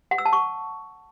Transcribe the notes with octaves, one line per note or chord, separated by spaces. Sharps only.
F#5
E6
A5
C#6